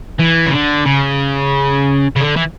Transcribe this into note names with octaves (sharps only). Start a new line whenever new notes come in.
E3
C#3
D3
C#3
C#3
D3
E3